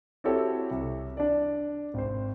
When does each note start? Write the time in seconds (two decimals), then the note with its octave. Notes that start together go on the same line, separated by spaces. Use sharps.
0.24 C4 E4 F#4 G4 A4 C#5
0.71 C2
1.17 D4 D5
1.94 G#1 C5